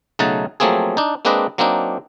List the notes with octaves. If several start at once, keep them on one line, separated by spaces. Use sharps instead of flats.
B1 C#3 A3 D#4 F#5 A5
F3 F#3 A3 A#3 C4 G#4
D4 D#4
G#3 A#3 C4 D4 B4 D#5
F#3 A#3 C4 D4 D#4